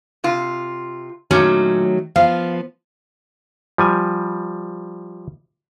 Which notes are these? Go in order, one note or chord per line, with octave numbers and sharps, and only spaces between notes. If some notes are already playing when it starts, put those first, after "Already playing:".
C3 F4
A#2 D#3 F#3 A3 C#4
F3 B3 F5
F3 G3 G#5